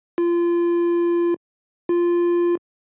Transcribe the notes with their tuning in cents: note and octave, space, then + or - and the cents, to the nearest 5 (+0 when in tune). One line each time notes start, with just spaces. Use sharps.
F4 -25
F4 -10